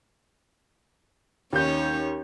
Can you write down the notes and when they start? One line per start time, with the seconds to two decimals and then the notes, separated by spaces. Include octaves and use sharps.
1.53 D#2 C#4 D#4 C#5 G6